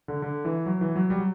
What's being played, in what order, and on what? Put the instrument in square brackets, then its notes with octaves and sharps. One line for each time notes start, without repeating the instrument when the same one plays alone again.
[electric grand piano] D3
D3
E3
F#3
E3
F#3
G3
F#3